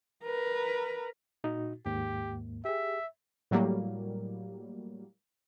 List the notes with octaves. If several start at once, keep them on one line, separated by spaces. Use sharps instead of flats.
A#4 B4
A#2 D#4 F#4
D#2 G#2 A#3 G4
G4 G#4 E5
A2 F#3 G3 A#3